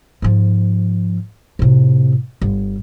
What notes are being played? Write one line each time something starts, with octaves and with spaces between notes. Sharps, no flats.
G#2 F3
A2 C3
G1